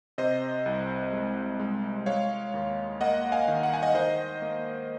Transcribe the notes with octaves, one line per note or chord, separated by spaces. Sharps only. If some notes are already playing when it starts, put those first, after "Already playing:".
C3 C5 D#5
C2
G#3
G#3
G#3 C#5 F5
D#2
A#3 D#5 F#5
F5 G#5
D#3
F#5
G#5
D#5 F#5
D#3 C5 D#5
A#3